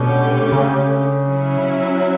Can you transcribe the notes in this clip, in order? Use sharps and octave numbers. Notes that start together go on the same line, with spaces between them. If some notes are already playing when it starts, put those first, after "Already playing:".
Already playing: B2 D3 A3 C#4 G4
C#3
F#3 C#4 E4